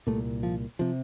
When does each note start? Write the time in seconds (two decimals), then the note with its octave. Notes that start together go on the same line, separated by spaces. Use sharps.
0.07 C2 A#2 A3
0.43 F3
0.79 C3 F3